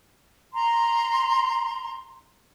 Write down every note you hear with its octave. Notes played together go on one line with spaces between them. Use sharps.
A#5 C6